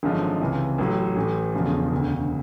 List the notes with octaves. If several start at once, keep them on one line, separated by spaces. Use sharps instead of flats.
G#1 F#2 D3 F3 G#3
C#2 C3 E3
A1 A2 F#3
A1 A2 E3
E1 E2 C#3 F3 A3
E1 D2 C#3